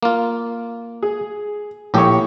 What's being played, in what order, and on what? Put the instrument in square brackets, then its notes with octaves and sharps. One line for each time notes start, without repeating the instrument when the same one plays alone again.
[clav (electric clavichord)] A#3 F4
[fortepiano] G#4
[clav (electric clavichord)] A#1 G4 [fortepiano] A2 C#5